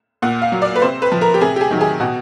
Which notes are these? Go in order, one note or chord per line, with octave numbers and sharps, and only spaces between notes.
A#2 F#5
F5
F#3
D5
B4
C3 C5
B4
F3
A#4
G4
C3 G#4
G4
G#4
D#3 F#3
G#4
B2 F#4